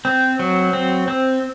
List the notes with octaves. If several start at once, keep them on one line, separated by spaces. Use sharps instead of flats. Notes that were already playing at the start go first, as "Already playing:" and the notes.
C4
F#3
C4
C4